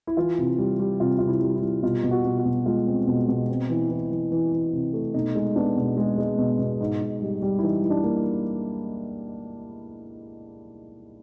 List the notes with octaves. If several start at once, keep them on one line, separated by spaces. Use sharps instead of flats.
E4
E3 F4
C3
G3
G3
C3 F4
C3 F4
E4
G3
E4
G3
B2 F4
B2
F#4
B2
F#4
B2
G#3 F4
C4
B2
B2
C4
E3
E3
E3
E3
E3
C3
A3
B2 D#4
G#3
B3 D4
B2
G#3
G#3
B2
B2
G#2
G#2
G3
G3
E4
E3 D#4
E3
D4
A#3